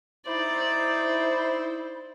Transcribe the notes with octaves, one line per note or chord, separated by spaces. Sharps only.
D#4 E4 C5 D5